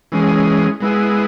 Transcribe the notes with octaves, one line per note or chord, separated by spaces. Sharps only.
E3 G#3 C#4 G#4
G#3 B3 E4 G#4